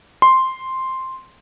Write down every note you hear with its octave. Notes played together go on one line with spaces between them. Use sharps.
C6